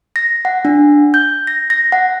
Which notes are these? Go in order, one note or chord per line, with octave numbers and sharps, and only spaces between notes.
A#6
F#5
D4
G6
A#6
A#6
F#5